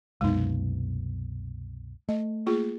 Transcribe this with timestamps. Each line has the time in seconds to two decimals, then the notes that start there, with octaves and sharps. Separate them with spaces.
0.21 C2 F#2 B2 G#3 D#4
2.09 A3 D#5
2.46 A#3 F4 G#4